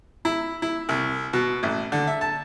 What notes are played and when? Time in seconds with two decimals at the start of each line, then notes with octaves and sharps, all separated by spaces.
0.25 E4
0.62 E4
0.89 C2
1.33 B2
1.63 A1
1.92 D3
2.07 E5
2.21 A5